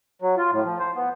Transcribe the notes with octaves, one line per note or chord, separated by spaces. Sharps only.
F#3
F4
A2
F3
C5
B3